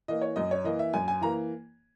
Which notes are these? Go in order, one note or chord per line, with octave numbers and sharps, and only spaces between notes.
E3 A#3 D#5
C#5
F#2 D#5
C#5
E3 A#3 D#5
E5
F#2 G#5
G#5
E3 A#3 A#5